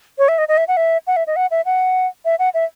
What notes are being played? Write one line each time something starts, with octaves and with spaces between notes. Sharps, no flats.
C#5
E5
D#5
D#5
E5
F#5
E5
F#5
E5
D#5
F#5
E5
F#5
E5
F#5
E5